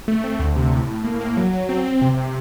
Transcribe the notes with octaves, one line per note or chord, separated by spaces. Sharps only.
A3
C4
D2
C3
A2
A2
A#3
A#3
F#3
F#3
C4
C4
C3
C3